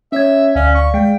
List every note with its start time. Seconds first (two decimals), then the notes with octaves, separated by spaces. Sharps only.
0.12 C#4 C#5 E5 G#6
0.55 D2 C#4 D5 F5
0.74 C#6
0.94 G#3 G5